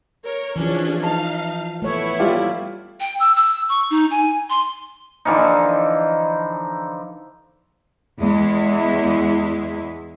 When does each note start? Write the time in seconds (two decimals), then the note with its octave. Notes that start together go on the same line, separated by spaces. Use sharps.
0.24 A#4 C#5
0.56 E3 F3 C#4 D4 G#4
1.03 D#4 F5 A5
1.82 A3 B3 E4 C#5
2.19 G3 F4 G4
3.00 G5
3.20 E6
3.36 E6
3.69 C#6
3.90 D#4
4.11 G#5
4.50 C6
5.25 D3 E3 F3 D#4
8.19 E2 G#3 E4